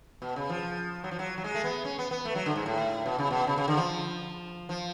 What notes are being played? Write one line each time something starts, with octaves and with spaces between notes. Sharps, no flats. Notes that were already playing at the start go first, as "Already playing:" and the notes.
B2
C#3
F3
F#3
F3
F#3
F#3
G#3
A3
B3
C#4
B3
B3
A3
F#3
D3
G#2
A2
B2
C#3
B2
C#3
C#3
D3
F3
F3